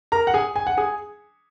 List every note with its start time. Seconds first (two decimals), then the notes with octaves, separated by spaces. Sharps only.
0.12 A#4 A#5
0.27 F#5
0.34 G#4 G#5
0.56 G#5
0.67 F#5
0.77 G#4 G#5